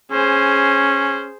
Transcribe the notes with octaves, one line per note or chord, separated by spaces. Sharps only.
C#4 G#4 C5